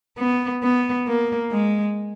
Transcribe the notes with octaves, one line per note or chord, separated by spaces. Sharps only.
B3
B3
A#3
G#3